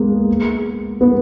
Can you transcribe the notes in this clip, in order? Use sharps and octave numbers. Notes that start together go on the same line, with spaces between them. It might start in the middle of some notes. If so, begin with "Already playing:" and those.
Already playing: G#3 A#3 B3
B3